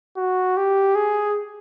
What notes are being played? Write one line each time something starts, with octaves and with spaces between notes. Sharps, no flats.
F#4
G4
G#4